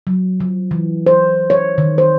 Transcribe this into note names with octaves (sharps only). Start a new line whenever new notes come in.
F#3
F3
E3
C5
C#5
D#3
C5